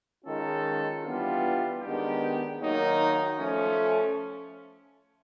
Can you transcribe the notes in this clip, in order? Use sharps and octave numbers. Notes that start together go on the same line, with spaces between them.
D#3 G#3 C#4 F4 A4
E3 G3 B3 D4 F4
D#3 G#3 B3 D4 G4
D#3 F#3 A#3 D#4
F3 A3 C#4